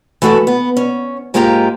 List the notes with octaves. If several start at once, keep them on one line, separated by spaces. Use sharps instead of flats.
E3 A3 F#4 A4 B4
B3
C#4
G#2 G#3 A#3 F4 G4 A#5